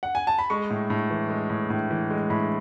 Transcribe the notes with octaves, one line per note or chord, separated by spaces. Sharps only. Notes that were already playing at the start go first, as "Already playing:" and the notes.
F#5
G#5
A5
B5
G#3 C#6
A2
A2
E3
G#3
A2
A2
E3
G#3
A2 B5